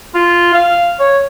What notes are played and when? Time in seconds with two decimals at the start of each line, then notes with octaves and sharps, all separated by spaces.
0.15 F4
0.54 F5
1.00 C#5